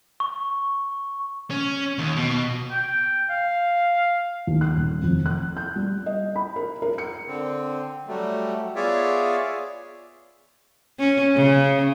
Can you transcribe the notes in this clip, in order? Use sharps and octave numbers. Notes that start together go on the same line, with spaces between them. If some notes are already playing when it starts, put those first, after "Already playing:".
C#6
C#4
D#2
B2
G5
F5
D#2
F#6
D#1
F1
F#6
G6
G3
D#5
B5
A#4
A#4
C#7
D3 C4
F#3 G3 A3
B3 F4 G#4 C#5 D5 E5
C#4
C#3